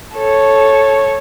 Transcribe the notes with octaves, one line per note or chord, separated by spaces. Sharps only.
A4 C#5